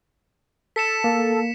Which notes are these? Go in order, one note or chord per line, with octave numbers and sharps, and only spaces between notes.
A4 B6 C#7 E7
A#3